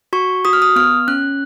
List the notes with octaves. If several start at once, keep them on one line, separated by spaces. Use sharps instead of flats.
F#4 C#6
F#4 D#6
F6
D#6
B3 F6
C#4 F#6